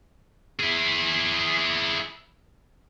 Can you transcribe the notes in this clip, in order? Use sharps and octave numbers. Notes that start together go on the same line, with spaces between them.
E4 G#4